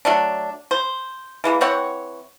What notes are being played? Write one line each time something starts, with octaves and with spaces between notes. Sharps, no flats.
F#3 A3 D4
C5
E3 G#3 A#3
E3 C4 C#5 F#5